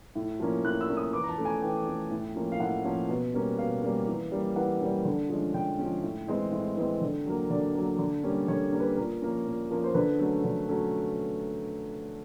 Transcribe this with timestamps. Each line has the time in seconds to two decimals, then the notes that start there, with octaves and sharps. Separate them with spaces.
0.15 A2
0.40 F3 A#3 C#4
0.64 A2 F#6
0.81 E6
0.89 F3 A#3 C#4
0.97 D#6
1.13 E3 D6
1.24 A#5
1.29 A5
1.38 A3 C#4
1.45 G#5
1.62 E3 G5
1.87 A3 C#4
2.11 A2
2.36 F3 A#3 C#4
2.52 F5
2.60 A2 F#5
2.85 F3 A#3 C#4
3.09 B2
3.34 G3 A#3 C#4
3.58 B2 F5
3.82 G3 A#3 C#4
4.07 E3
4.32 G3 A#3 C#4
4.56 E3 F#5
4.81 G3 A#3 C#4
5.05 D3
5.29 F3 G#3 C#4
5.54 D3 G5
5.78 F3 G#3 C#4
6.03 A2
6.27 E3 G#3 C4
6.52 A2
6.76 E3 G#3 C4
7.01 D3
7.26 F#3 A#3
7.50 D3 D5
7.75 F#3 A#3
7.99 D3
8.23 G3 A#3 C#4
8.48 D3 C#5
8.72 G3 A#3 C#4
8.80 B4
8.97 A#2 A#4
9.22 F3 A#3 C#4
9.46 A#2
9.70 F3 A#3 C#4
9.84 C5
9.94 D3 B4
10.19 F#3 A3 C#4
10.44 D3
10.69 F#3 A3 C#4